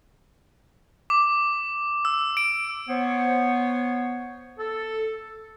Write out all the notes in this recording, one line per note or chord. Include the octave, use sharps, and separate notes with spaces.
D6
E6
D7
B3 C5 C#5
A4